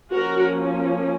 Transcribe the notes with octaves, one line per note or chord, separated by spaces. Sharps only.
F3 A#3 C#4 F#4 A#4